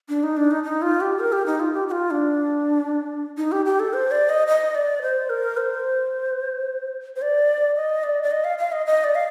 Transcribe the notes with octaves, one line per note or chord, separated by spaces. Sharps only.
D4
D#4
D4
D#4
D#4
F4
G4
A#4
G4
D#4
F4
G4
G4
F4
D4
D#4
G4
G4
A4
C5
D5
D#5
D#5
D5
C5
A#4
C5
C5
D5
D#5
D5
D5
D#5
F5
F5
D#5
D#5
D5
F5